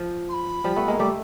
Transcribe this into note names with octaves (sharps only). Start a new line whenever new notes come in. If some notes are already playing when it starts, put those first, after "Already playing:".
Already playing: F3
C6
B5
F3 G3
A3 B3
G#3 A#3
G3 A3 D6